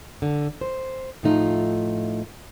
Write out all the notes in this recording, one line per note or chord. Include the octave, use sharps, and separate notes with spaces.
D3
C5
A2 F3 A3 D#4 F4